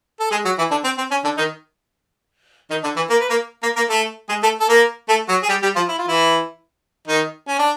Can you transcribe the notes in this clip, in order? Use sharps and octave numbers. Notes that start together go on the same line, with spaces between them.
A4
G#3 G#4
F#3 F#4
E3 E4
D3 D4
C4
C4
C#4
D3 D4
D#3 D#4
D#3 D#4
D3 D4
E3 E4
A#3 A#4
B4
A#3 A#4
A#3 A#4
A#3 A#4
A3 A4
G#3 G#4
A3 A4
A4
A#3 A#4
A3 A4
F#3 F#4
G#4
G3 G4
G3 G4
F3 F4
E4
F4
E3 E4
D#3 D#4
C#4
D4